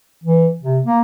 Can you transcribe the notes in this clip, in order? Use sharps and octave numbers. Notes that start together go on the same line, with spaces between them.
E3
C3
A#3